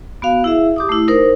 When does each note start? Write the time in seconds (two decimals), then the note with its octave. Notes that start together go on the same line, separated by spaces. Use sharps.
0.22 B3 F#4 F5
0.44 E4 G#4 E5
0.76 G4 D6 D#6
0.89 A3 E4
1.08 D#4 A#4 C5